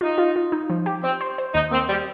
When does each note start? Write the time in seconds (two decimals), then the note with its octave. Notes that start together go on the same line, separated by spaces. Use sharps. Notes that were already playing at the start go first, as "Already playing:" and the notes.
0.01 D#4 F4
0.18 F4
0.36 F4
0.52 D#4
0.70 F3
0.86 G4
1.03 C4 C5
1.21 C5
1.38 C5
1.54 D#2 D#4
1.71 A#3 C4
1.88 G3